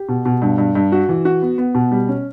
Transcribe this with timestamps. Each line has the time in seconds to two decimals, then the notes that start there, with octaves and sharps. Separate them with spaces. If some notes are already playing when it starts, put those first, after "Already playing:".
Already playing: G4
0.09 B2
0.25 B2
0.42 G2
0.58 G2
0.75 G2
0.92 F#4
1.09 E3
1.25 F#4
1.42 B3
1.58 B3
1.75 B2
1.91 G3
2.09 C#4